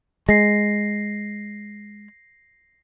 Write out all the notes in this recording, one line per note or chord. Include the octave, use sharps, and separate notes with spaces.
G#3 A#6 C7